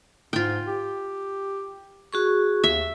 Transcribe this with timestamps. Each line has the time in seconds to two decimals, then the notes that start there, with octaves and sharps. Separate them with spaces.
0.33 G#2 F4 G5
0.67 G4
2.13 F#4 G#4 C#6
2.64 D#2 E5